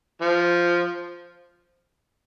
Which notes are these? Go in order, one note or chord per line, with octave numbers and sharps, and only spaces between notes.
F3